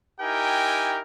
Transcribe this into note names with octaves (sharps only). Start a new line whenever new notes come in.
D#4 E4 G4 A#4 G5 G#5